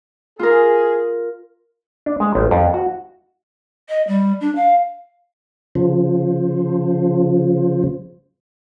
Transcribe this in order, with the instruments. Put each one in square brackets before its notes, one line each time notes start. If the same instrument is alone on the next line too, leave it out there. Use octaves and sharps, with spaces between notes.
[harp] F4 A#4 [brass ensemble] G#4
[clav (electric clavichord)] D4
G#3
A1
F2
F#4
[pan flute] D#5
G3
D4
F5
[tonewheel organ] C#3 F3